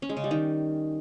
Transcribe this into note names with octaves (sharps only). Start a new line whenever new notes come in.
C#4
G#3
C#3
G3
D#3